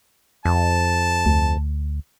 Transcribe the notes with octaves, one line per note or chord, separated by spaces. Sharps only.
F2 A5
D2